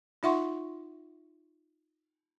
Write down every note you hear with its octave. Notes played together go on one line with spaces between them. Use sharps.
D#4 F4 E5 F#5 C6 C#6